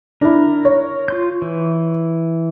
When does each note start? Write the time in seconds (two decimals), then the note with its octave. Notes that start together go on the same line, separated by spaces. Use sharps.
0.21 D4 E4 A#4
0.65 C#5
1.08 F4 C6 G6
1.42 E3